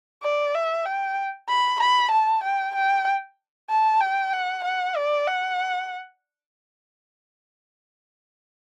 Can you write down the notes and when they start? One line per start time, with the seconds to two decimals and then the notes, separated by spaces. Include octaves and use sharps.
0.23 D5
0.55 E5
0.86 G5
1.49 B5
1.80 B5
2.12 A5
2.44 G5
2.75 G5
3.70 A5
4.01 G5
4.33 F#5
4.64 F#5
4.96 D5
5.27 F#5